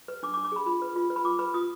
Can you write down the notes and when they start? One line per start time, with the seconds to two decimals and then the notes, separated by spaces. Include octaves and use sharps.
0.08 B4
0.23 D4 D6
0.34 D6
0.37 D4
0.45 D6
0.52 G#4 B5
0.66 F4 B5
0.82 B4
0.96 F4
1.10 B4
1.16 B5
1.25 F4 D6
1.39 B4 B5
1.54 F4 D#6